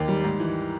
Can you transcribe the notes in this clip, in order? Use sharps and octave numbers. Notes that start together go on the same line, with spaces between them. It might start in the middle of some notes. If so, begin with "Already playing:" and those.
Already playing: D#2 D#3 A#3
G3
G#2
E3